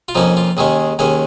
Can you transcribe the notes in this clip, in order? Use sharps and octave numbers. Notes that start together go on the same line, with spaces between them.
F4
F2 F3 A#3 C#4 D#4
F4
D#2 D#3 G#3 C#4 G#4
D#2 D#3 G#3 C#4 G#5